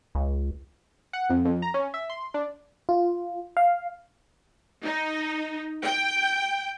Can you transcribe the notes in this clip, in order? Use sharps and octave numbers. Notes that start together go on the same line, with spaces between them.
C#2
F#5
F2
F2
A#5
C#4
E5
C6
D4
F4
F5
D#4
G5